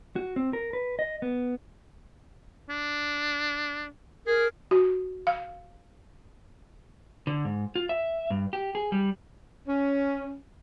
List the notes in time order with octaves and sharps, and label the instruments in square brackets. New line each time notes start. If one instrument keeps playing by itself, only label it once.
[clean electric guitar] F#4
C4
A#4
B4
D#5
B3
[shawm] D4
[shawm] G#4 [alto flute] A#4
[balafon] F#4
F5
[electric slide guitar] D3
G#2
F4
E5
G2
G4
G#4
G3
[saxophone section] C#4